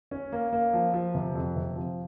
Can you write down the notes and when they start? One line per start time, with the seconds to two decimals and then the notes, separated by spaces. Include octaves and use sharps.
0.11 C#4
0.32 A#3
0.53 A#3
0.73 F3
0.93 F3
1.15 C3
1.35 F2
1.56 C3
1.76 F3